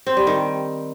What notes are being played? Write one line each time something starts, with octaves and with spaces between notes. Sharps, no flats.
C4
G3
D#3